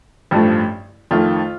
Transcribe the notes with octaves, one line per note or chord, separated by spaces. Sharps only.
A1 G2 F3 A3
F2 D#3 A3 F4